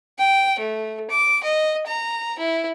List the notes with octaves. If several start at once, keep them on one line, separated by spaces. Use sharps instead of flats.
G5
A3
D6
D#5
A#5
E4